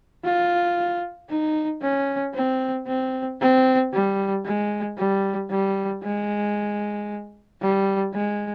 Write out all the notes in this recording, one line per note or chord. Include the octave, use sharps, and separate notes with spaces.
F4
D#4
C#4
C4
C4
C4
G3
G#3
G3
G3
G#3
G3
G#3